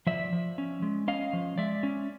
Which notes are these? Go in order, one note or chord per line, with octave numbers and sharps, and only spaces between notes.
F3 D5 E5
F3
C#4
G#3
C#4 D#5 F5
F3
G#3 D5 E5
C#4